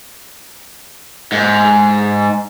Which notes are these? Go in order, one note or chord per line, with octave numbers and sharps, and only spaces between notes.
G#2